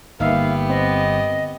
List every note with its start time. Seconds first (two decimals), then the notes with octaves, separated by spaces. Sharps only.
0.20 G1 A#3 B3 D#4 G4 E5 F5
0.70 C4 D#5